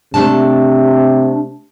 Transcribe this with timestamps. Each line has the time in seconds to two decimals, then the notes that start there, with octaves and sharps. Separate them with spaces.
0.14 C3 A3 D4 A5